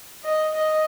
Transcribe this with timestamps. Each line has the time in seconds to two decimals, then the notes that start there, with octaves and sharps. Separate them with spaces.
0.24 D#5
0.54 D#5